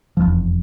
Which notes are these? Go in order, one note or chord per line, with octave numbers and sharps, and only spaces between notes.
F1 E2 D3 F3